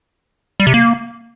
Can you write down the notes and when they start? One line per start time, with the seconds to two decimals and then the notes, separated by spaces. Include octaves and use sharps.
0.60 G3
0.67 C3
0.74 A#3